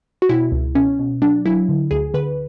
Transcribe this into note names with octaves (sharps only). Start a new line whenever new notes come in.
F#4
B2 E4
C#2
B2 C#4
B2
F#3 D4
F#3 E4
D3
D2 G#4
D3 B4